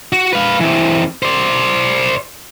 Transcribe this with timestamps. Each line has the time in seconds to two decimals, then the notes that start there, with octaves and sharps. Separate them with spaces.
0.12 F#4
0.33 B4 F5
0.60 E3 C4
1.23 C5 D5